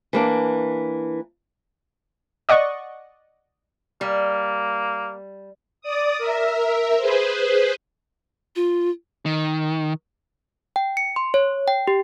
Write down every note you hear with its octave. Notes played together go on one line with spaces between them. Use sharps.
E3 A#3 D4
D5 D#5 F#5 C#6
G3 A#3
D5 D#6
A#4 E5
G#4 B4 C5
F4
D#3
G5
C#7
C6
C#5
G5
G4